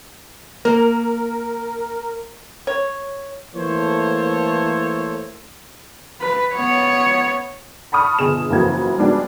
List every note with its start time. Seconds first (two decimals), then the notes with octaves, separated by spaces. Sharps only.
0.65 A#3 A#4
2.67 C#5
3.54 E3 A3 A#3 A4 C5 C#5
6.21 B4
6.54 B3 C#5
7.92 A5 B5 C#6 D#6 F6
8.19 G1 B2 G#4 E7
8.50 F#1 F2 E3 A#3 F#4 G#6
8.98 G3 G#3 B3 D4 F#4